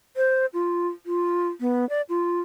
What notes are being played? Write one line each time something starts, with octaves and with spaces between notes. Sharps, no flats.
C5
F4
F4
B3
D5
F4